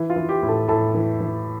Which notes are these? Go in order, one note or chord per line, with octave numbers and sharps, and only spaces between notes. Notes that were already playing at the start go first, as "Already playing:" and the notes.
Already playing: E3
F4
E3
G4
A2
A4
A2 A4
E3
E3